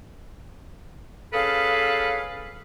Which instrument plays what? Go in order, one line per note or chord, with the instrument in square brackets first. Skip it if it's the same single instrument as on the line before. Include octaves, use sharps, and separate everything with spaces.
[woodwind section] C#4 G#4 A4 B4 F5